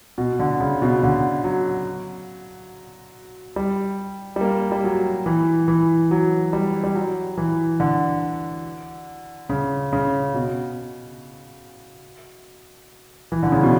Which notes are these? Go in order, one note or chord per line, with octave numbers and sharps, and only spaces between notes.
B2
D3
C#3
B2
D3
F#3
G3
G3
A#3
G3
F#3
E3
E3
F#3
G3
G3
F#3
E3
D3
C#3
C#3
B2
E3
D3
C#3
B2